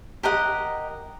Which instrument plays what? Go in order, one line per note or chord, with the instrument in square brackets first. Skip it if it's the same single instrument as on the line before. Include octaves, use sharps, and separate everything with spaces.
[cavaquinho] G4 A#4 D#5 F#5